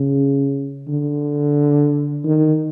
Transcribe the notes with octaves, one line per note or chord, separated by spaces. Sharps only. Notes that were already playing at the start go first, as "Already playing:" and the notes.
Already playing: C#3
D3
D#3